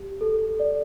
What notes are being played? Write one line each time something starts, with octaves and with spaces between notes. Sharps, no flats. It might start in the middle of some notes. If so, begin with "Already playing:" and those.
Already playing: G4
A4
D5